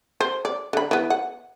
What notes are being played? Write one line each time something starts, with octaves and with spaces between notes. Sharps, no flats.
C5
D5
D3 B5
E3 B3
F#5